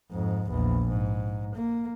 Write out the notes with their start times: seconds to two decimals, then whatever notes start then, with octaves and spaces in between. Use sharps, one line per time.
0.12 F2 G#2
0.49 A#1 E2
0.88 G#2
1.55 A#3